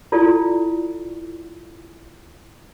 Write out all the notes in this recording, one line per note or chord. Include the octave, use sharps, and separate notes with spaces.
E4 F4 A4 D5